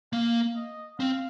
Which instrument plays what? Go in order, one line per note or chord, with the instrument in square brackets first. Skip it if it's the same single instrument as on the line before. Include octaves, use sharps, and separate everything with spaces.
[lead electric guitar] A#3 [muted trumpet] F5
[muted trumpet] D#5
[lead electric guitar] C4 [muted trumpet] F5